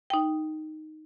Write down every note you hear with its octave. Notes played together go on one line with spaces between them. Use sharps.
D#4 G5